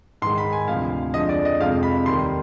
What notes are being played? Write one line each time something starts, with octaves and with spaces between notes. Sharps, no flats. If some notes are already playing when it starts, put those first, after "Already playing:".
G#2 D#3 G#3 C6
B5
G#5
D2 C3 F3 F5
F2 D3 F3 G#3 D#5
D5
D#5
F2 C3 F3 G#3 F5
B5
D#2 D#3 G3 C6